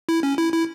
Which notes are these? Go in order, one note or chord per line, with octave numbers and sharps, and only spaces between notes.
E4
C#4
E4
E4